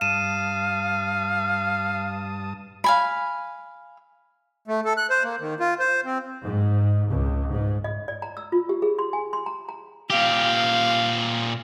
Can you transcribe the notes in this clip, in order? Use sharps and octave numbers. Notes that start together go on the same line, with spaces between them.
G2 F5 A5 D#6 D#7 E7
F5 G#5 B5
A3
A4
F#6
C5
A#3
D#3
F4
C5
C4
G#2
C#2
G#2
D#5
D5
A#5
E6
F4
G4
G#4
C6
G#5
C6
A#5
A#5
A#2 G4 F5